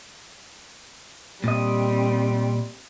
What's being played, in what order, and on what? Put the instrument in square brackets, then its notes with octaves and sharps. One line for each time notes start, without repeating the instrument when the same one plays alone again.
[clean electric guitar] A#2 D#5 [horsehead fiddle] G3 C4